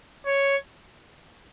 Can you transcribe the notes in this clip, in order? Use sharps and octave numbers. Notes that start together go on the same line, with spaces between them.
C#5